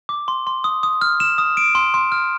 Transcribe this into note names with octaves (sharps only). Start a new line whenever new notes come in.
D6
C6
C6
D#6
D#6
F6
E7
D#6
D7
C6
C6
F6